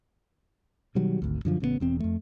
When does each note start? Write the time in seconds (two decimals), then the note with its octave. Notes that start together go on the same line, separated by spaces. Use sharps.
0.95 B2 D#3 F#3 G3
1.22 G#1 D2
1.45 F#2 D3 F3
1.60 A1 C#3 G3 B3
1.80 E1 E2 C4
2.00 F2 A3